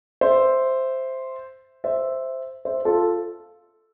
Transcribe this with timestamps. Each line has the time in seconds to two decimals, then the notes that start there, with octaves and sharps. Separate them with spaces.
0.21 C5 E5
1.84 C5 E5
2.65 C5 E5
2.85 F4 A4